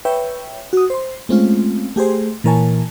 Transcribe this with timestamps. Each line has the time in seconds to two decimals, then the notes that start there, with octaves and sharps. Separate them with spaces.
0.05 B4 C#5 E5 G5
0.73 F#4 D#6
0.90 C5 C6
1.29 G#3 A3 C4 C#4 F4
1.96 A3 G4 G#4 C5
2.44 A#2 E3 A#4 C#5 G#5 A5